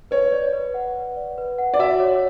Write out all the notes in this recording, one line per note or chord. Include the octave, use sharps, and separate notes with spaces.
B4 C#5
D5
B4
F#5
B4
D5
B4
F#5
D5
F#4 E5
C#5